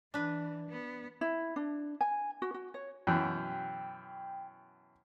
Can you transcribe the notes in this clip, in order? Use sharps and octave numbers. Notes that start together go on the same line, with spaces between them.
E3 D4 B4
B3
E4
D4
G#5
F#4
F#4
C#5
F#2 B2 E3 G5